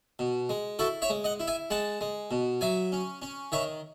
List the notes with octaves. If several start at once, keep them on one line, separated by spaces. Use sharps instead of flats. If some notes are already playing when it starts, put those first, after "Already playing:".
B2
G#3
E4 F#4 A4
C#5 E5
G#3
D#5 F#5
E4
E5 G#5
G#3 F#5 A5
G#3
B2
F#3 E5 G#5
C#4
C#4
D#3 C#5 E5